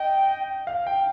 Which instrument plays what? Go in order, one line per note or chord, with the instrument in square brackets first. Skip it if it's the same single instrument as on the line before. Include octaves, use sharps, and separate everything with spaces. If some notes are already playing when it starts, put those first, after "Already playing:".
Already playing: [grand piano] D#5 [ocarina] G5
[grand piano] F5
G5